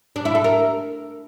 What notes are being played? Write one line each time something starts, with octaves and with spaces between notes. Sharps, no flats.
D4
E4
A4
A#4